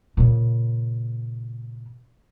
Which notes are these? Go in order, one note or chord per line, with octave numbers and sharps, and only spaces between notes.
A#2 C#3